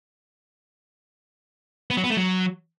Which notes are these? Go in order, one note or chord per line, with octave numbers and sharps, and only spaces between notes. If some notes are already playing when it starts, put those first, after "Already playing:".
B3
F#3
B3
A3
F#3